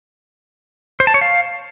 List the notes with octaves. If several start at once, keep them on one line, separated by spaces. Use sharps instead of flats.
C5
A5
C#5
F5